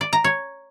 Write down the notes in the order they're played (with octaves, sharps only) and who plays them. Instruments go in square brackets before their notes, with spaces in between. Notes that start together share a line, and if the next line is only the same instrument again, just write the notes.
[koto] D5
A#5
C#5